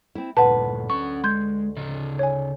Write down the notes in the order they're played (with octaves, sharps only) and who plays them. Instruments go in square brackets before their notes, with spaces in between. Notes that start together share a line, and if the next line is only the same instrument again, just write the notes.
[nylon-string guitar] C4 E4
[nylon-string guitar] D2 B4 [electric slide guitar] G2 A#2 [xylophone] F#5 A5
[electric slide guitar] C#4 F#5 [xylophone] C#6
[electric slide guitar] G#3 [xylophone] C6 G6 G#6
[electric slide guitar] C#3 D5 D#5
[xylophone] C#5 G#5